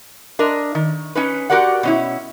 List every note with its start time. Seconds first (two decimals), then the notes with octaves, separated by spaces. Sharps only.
0.39 D4 A#4 D#5
0.75 D#3
1.15 C#4 D#4 B4
1.50 F#4 G4 A#4 D5 F#5
1.83 B2 C#4 E4